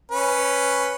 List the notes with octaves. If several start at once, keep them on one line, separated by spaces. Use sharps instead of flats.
C#4 B4